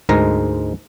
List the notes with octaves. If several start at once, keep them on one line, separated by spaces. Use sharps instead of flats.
D2 G#2 G#3 A#4 A#5